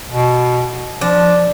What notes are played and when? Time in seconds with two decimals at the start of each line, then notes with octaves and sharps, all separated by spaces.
0.11 B2
1.01 F3 D4